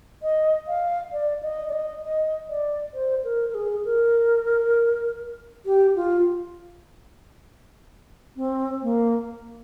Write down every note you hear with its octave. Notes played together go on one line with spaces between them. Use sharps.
D#5
F5
D5
D#5
D5
D#5
D#5
D5
C5
A#4
A#4
G#4
A#4
G4
F4
C4
A#3